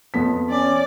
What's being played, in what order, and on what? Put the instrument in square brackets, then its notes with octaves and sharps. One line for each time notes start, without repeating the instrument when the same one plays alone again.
[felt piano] F2 B3 B6
[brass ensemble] C#4 [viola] D5